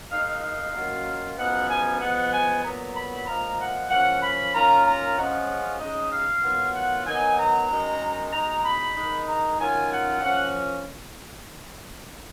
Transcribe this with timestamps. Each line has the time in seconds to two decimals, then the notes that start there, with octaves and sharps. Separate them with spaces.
0.10 D#3 G#3 D#4 F5
0.42 F5
0.74 F#2 D#3 F#3 A#3 F4
1.36 F#2 F3 G#3 B3 D#4 F#5
1.68 G#5
1.99 F3 G#3 B3 F#5
2.31 G#5
2.63 A#2 F#3 B3 A#5
2.94 B5
3.27 A#2 F3 G#3 A#5
3.59 F#5
3.89 F3 A#3 C#4 F4 F#5
4.21 B5
4.53 D#3 A#3 C#4 F4 A#5
4.84 A#5
5.16 C#3 F3 G#3 C#4 F4 F#5
5.79 C#3 G#3 D#4 D#5
6.11 F5
6.43 D#3 F#3 B3 F4
6.74 F#5
7.05 D#3 F#3 B3 D#4 G#5
7.38 A#5
7.69 F#2 D#3 G#3 D#4
8.32 B2 G#3 D#4 A#5
8.63 B5
8.95 D#3 G#3 D#4
9.27 A#5
9.59 D#3 F#3 C#4 F4 G#5
9.91 F#5
10.22 F3 A#3 C#4 F#5